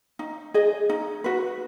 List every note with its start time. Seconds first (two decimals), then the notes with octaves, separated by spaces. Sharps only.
0.19 D#4
0.54 G#4 D#5
0.89 D#4
1.24 F#4 B4